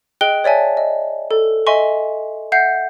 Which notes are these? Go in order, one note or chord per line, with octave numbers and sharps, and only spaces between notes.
G#4 D#5 G5 F#6 G7
C#5 D5 E5 G#5 A5
D#5
A4
D#5 E5 G#5 C6 C#6
E5 F#5 G6 C7